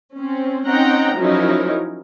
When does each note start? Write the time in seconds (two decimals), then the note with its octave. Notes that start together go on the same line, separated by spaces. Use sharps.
0.16 C4 C#4
0.66 C4 C#4 D#4 F#5 G5 A#5
1.17 F3 F#3 C#4 D#4 E4 A#4